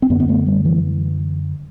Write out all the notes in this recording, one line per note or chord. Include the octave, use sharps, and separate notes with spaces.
C4
F#2 D3 B3
B3
A3
G3
E3